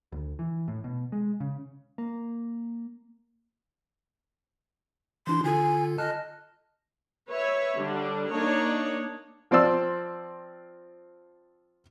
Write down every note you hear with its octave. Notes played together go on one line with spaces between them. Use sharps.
D2
E3
A2
B2
G#3
C#3
A#3
E3 D4 E4 C6
D3 F4 A4 G#5
D#5 A5 F6 F#6
B4 C#5 E5
D3 G3 D4
A#3 D4 D#4 C#5
F3 C4 D5 C6 E6